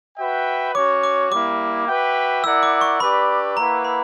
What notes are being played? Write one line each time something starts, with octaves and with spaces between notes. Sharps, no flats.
F#4 B4 E5 G5
C#4 F#4 C#5 D6
D6
G3 A#3 E4 D6
F#4 B4 E5 G5
E4 A#4 D5 F#5 E6
D6
C#6
D4 G4 B4 D5 B5
A#3 E4 B4 F#5 A#5
B5